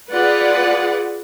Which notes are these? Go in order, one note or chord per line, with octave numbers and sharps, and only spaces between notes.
F4 G#4 B4 D5 F#5